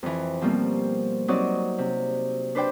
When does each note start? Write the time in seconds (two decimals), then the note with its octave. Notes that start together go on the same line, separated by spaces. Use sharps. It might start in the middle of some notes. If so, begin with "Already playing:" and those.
0.03 F2 E3
0.41 B2 F3 G3 A#3 C4
1.28 F#3 C4 D#4 F#4 D5 D#5
1.78 C3
2.55 D4 B4 C5 D5 G5